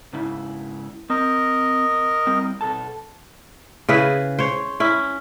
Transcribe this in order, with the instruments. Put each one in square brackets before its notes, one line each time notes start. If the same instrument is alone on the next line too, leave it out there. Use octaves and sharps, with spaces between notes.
[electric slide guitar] G#2 C#3 E4
[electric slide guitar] C4 [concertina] A#4 D#5
[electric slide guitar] G3 C4
B2 A4 A5
[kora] C#3 E4 G#4 B4
C5 C#5
C#4 E4